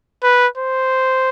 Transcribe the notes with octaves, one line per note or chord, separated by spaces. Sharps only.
B4
C5